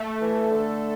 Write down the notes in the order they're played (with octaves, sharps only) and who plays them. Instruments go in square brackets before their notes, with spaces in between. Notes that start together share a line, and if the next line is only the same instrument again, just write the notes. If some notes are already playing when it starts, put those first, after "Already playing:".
Already playing: [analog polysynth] A3
[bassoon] E3
D3